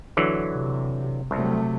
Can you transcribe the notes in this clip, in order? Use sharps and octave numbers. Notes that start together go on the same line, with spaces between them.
D3 E3 F#3
C3
C2 C3 F#3 A3